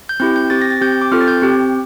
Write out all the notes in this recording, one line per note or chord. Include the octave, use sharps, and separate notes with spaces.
G6
C4 E4 G4 G6
G6
C4 G4 A6
A#6
A6
C4 G4 G6
G6
D6
C4 F4 A4 F6
A6
G6
C4 G4